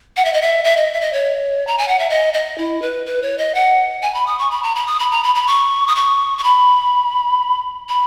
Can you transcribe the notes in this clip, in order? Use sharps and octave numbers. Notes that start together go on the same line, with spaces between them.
F#5
E5
D#5
E5
E5
D#5
E5
D#5
C#5
A#5
G#5
F#5
E5
D#5
D#5
E4
B4
B4
C#5
D#5
F#5
G#5
B5
D#6
C#6
B5
A#5
B5
D#6
B5
A#5
B5
B5
C#6
D#6
C#6
C#6
B5
B5